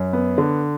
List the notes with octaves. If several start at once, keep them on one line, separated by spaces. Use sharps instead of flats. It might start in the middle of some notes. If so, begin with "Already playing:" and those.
Already playing: F#2
B3
D3